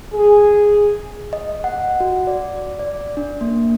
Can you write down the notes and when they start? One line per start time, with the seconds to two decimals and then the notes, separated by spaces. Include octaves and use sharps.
0.13 G#4
1.33 D#5
1.64 F#5
2.00 F#4
2.27 D5
2.79 D5
3.17 D4
3.41 A#3